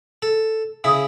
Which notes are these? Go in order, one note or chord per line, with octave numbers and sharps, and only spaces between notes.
A4
C#3 E4 D#6